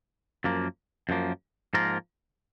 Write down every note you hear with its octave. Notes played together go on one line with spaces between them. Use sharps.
F#2 F3 A#3
F#2 F3 A#3
G#2 F3 A#3 F4 A#4